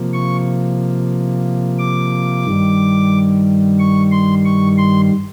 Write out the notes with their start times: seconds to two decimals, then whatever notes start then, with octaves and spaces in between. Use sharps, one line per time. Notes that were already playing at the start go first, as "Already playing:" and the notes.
Already playing: C3 F3 A#3
0.13 C#6
1.79 D6
2.45 G2 D#3 G3
3.79 C#6
4.11 C6
4.45 C#6
4.78 C6